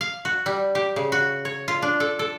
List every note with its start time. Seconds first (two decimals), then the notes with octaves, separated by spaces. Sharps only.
0.01 F5
0.25 F#4
0.46 G3
0.75 G4
0.96 C#3
1.12 F#4
1.45 C#5
1.68 F4
1.82 D4
2.00 A4
2.19 A4